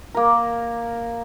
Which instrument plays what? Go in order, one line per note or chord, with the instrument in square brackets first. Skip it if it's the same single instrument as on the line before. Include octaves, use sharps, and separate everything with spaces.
[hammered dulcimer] A#3 A#4